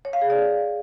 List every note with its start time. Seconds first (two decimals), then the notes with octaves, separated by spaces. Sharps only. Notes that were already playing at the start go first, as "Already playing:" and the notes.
0.05 C#5
0.13 F5
0.22 G#4
0.30 D5